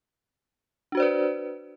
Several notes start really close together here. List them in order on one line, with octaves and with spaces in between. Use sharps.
D4 F#4 C5 D5 B4